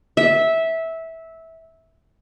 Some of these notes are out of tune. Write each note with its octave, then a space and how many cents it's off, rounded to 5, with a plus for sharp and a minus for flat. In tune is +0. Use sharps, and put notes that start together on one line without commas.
E5 -15